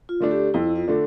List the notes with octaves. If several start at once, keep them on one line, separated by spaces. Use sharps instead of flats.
F4
D3 A3 D4
G4
F2 E4
F4
D3 A3 D4